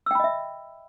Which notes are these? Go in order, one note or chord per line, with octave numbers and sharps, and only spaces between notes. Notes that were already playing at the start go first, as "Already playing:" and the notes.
D#5 E5 G5 B5 E6